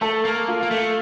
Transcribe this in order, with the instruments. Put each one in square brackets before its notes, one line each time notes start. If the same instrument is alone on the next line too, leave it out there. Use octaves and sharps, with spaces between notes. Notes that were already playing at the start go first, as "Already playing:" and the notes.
[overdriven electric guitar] A3 [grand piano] A4
[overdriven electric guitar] A#3
[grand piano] F4
[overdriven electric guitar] A#3
A3